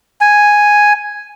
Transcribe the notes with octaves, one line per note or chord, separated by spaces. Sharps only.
G#5